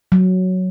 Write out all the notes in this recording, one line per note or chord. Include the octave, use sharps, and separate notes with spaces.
F#3